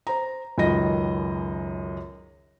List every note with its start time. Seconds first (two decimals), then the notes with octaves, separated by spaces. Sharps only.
0.07 C5 A#5
0.58 C#2 F#2 D#3 D#5 A#6